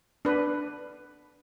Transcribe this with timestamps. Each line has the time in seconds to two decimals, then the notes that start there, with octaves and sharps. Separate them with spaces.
0.25 D4 B4